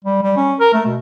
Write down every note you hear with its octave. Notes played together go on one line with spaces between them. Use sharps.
G3
G3
C#4
A#4
A3
B2